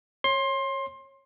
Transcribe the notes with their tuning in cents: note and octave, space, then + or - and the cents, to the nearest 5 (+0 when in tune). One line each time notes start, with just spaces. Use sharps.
C#5 -20 C6 +20